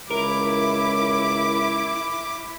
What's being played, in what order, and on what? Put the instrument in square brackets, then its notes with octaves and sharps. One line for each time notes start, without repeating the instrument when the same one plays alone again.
[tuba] C#2 [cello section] E4 [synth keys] A#4 [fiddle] D6